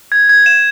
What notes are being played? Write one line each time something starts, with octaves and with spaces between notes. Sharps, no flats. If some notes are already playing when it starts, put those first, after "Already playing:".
G#6
G#6
E7